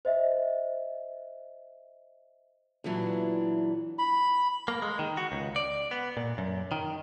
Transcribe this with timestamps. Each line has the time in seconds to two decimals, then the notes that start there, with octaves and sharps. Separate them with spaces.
0.05 C5 D#5 E5
2.84 E2 A#2 E3 F#3 D4
3.99 B5
4.68 A#3
4.82 G#3
4.99 D#3
5.17 F#4
5.32 C#2
5.56 D5
5.91 B3
6.17 A#2
6.38 F#2
6.72 D#3